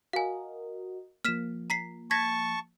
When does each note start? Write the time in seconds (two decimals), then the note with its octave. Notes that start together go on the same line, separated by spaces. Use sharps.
0.13 F#4 A#4 D#5 F5 G#5
1.25 F3 A#3 F6 B6 E7
1.70 A#5 B6 C7
2.11 A5 C#6 G#6 A#6 B6